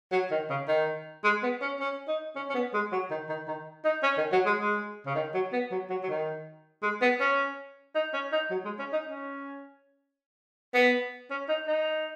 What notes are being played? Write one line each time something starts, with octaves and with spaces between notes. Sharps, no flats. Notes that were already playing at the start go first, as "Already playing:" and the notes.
F#3
D#3
C#3
D#3
G#3
B3
C#4
C#4
D#4
C#4
C#4
B3
G#3
F#3
D#3
D#3
D#3
D#4
C#4
D#3
F#3
G#3
G#3
C#3
D#3
F#3
B3
F#3
F#3
F#3
D#3
G#3
B3
C#4
D#4
C#4
D#4
F#3
G#3
C#4
D#4
C#4
B3
C#4
D#4
D#4